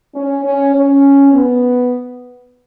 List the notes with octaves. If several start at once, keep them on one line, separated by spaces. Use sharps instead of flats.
C#4
C#4
C#4
B3